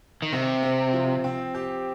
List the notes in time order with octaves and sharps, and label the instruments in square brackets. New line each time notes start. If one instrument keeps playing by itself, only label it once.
[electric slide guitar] D#3
[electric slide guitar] C3 [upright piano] C4
[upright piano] C4
F3
C4
G4